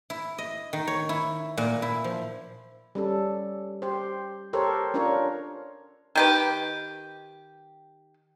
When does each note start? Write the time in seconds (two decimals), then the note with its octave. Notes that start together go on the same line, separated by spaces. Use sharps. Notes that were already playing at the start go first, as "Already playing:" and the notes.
0.10 E4
0.38 D#5
0.73 D#3
0.87 C#5
1.09 E4
1.57 A#2
1.82 E4
2.04 F3
2.95 G3 C#4 A4
3.82 G4 C5
4.53 G4 A4 A#4 C5 C#5
4.94 C#4 D4 F4 A#4 C#5
6.15 D#3 G4 B4